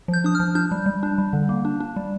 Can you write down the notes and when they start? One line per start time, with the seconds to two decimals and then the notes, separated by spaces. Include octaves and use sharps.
0.08 F3
0.14 G6
0.24 D4 D#6
0.35 F3 F6
0.55 D4 G6
0.71 G3
0.86 G3
1.03 D4
1.18 G3
1.33 D3
1.49 A#3
1.65 D4
1.80 D4
1.96 G3